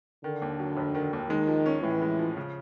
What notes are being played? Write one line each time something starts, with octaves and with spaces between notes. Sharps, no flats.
D3 D#3
D#2
F#3
F1
D#3
D#2
D#3 G#3
F3
C#4
A2 E3
G#3
F3
C#3